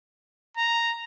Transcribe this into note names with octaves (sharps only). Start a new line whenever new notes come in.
A#5